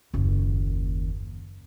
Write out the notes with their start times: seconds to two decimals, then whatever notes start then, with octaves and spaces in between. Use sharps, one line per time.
0.14 F#1 D#2